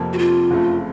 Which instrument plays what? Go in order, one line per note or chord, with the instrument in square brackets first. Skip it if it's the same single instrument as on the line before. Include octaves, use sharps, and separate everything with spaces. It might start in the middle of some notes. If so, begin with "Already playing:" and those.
Already playing: [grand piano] F1 F2 C3 F3 A#3
[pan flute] F#4
F4
[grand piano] F#1 F2 C#3 A3